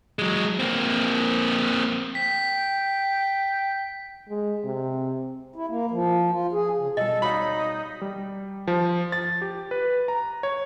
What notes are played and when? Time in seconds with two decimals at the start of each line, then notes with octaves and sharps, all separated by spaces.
0.19 F#3 G#3
0.60 A#3 C4
2.15 G5 B6
4.29 G#3
4.65 C3
5.56 E4
5.69 A#3
5.91 F3
6.31 F4
6.52 G#4
6.78 C#3
6.97 B2 G3 A4 D#5
7.22 D#4 F#4 C#5 F5 B5
8.01 G3
8.67 F3
9.12 A6
9.42 G4
9.71 B4
10.08 A#5
10.43 C#5